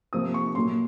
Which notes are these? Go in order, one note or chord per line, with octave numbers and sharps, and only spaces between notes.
C3 F3 A#3 D#6
C#6
A#2 F#3 A#3 C6